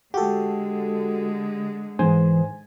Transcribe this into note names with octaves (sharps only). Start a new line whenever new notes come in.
D3 G#3 F#4 G4 A4
G#2 E3 C5 G#5